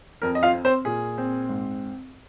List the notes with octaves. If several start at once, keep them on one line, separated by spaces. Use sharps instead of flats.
F2 A#4
D#5
F4 F5
C4
C4 C5
A#2 G#4
C4
G#2